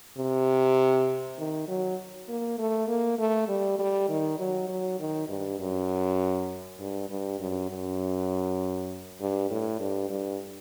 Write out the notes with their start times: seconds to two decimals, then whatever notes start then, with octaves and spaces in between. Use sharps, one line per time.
0.18 C3
1.38 D#3
1.68 F#3
2.28 A#3
2.58 A3
2.88 A#3
3.19 A3
3.48 G3
3.79 G3
4.09 D#3
4.40 F#3
4.68 F#3
5.00 D#3
5.29 G2
5.60 F#2
6.80 G2
7.09 G2
7.40 F#2
7.70 F#2
9.21 G2
9.50 A2
9.80 G2
10.10 G2